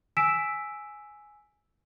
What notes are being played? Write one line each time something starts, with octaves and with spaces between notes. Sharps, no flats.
G#5 E6 B6 D7 E7